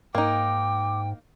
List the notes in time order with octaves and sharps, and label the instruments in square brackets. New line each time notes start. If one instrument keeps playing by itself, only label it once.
[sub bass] G#2 [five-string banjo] A#3 D#4 [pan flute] G5 [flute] D6